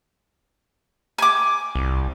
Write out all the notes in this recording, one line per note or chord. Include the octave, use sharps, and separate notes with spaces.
G#5 D6
C2